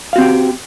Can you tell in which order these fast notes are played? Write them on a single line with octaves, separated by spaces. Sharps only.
F5 F#4 C4 G4